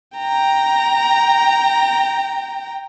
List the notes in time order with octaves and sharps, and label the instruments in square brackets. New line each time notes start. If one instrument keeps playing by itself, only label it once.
[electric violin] G5 A#5